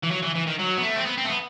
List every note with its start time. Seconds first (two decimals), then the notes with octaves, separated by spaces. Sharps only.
0.04 E3
0.11 F#3
0.23 E3
0.36 E3
0.47 D#3
0.60 F#3
0.77 B3
0.83 A3
0.96 C4
1.06 B3
1.18 C4
1.25 A3
1.29 B3